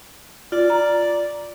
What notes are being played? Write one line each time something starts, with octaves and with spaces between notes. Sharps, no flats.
F4 D5
A#5